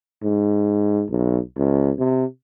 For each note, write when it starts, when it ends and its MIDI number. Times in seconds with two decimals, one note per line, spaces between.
0.23 1.05 44
1.10 1.39 35
1.57 1.91 37
1.98 2.25 48